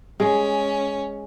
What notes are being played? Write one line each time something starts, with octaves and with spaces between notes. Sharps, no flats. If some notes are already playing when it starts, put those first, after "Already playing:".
G#3 C#4 G#4